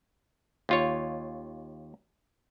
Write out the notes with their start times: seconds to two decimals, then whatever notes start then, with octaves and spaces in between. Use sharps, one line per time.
0.69 D#2 F4 C#5